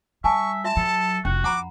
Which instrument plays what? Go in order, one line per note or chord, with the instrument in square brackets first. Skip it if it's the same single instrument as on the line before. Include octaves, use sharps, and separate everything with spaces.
[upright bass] G3 [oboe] E5 [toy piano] G#5 A5 [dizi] C#6
[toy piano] F4 E5 C6 [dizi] A5
[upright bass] F#3 [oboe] A4
[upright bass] F1 [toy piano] C#4 [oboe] F#4
[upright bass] F2 [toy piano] F#5 A#5 B5 [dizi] D6